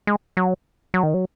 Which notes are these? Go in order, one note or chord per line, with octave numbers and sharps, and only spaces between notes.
G#3
F#3
F#3
D#3
F#3